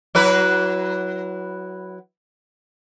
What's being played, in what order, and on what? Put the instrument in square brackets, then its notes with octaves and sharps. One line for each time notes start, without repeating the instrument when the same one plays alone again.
[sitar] F#3 E4 B4